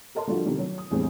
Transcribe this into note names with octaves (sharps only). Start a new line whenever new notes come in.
A4 A#4 D#5 A5 C6
D3 F3 G3 F4 F#4
C3 D#3 G3
F#3
D#6
A#1 E2 A2 G3 G#3 C4